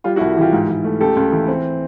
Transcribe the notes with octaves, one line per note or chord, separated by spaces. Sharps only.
G3 F4
E4 F#4
C2
E3 F4 G4
G#2
G#2
A3
C#2 G4 A4
C#2
E3
C4